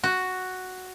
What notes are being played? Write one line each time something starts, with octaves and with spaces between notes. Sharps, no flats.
F#4